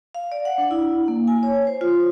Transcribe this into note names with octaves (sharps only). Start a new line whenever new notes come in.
F5
D5
F#5
D4
E4
A#3
G#5
C#5
C5
F4